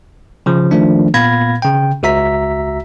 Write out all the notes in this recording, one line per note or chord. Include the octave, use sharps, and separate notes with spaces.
C#3 F3
D#3 F3 A3 D4
A#2 B3 F5 B5 G#6 A#6
C#3 G5
C#2 F#4 E5 A#5 B6